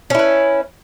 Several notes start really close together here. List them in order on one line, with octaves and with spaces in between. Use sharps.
C#4 E4 B4